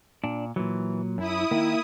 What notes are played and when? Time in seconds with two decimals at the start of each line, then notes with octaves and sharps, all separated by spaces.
0.24 A#2 D4
0.56 A#2 E3 F#3
1.18 F#2 E4 D#6
1.51 D#3 A#3